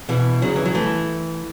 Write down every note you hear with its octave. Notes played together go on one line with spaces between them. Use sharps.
B2 E3
C#3 F#3
E3
F#3
E3 A3